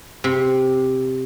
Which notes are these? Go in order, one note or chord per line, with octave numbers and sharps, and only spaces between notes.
C3